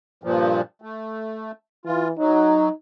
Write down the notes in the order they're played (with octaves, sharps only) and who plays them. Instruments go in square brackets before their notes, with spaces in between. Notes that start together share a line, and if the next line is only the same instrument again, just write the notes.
[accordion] G2 A#2 F3
A3
[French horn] E3 [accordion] F4
[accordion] F#3 [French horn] D#4